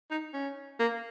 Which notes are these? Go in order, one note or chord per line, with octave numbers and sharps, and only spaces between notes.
D#4
C#4
A#3